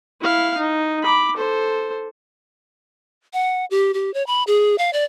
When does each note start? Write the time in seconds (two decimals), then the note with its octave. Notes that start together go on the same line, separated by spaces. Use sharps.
0.21 E4 F5
0.58 D#4
1.03 B5 D6
1.36 A4 C5
3.33 F#5
3.71 G4
3.94 G4
4.14 C#5
4.27 B5
4.47 G#4
4.78 F5
4.93 D5